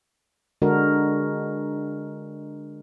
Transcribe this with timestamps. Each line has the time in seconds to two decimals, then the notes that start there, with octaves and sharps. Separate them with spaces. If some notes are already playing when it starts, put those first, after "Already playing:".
0.62 D3 G#3 D4 F#4 A#4